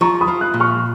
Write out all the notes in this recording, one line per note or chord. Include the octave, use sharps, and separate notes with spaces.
F3 A#5 C#6
B5 D#6
F3
D#6 F#6
A#2
C#6 F6